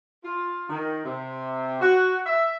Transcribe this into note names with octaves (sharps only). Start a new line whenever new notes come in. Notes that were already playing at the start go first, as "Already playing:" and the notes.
F4
D#3
C3
F#4
E5